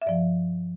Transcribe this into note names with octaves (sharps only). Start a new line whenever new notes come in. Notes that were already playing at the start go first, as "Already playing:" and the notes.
E5
G2 F3 D5